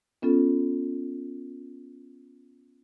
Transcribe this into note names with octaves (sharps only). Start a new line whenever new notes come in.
B3 C#4 F4 A4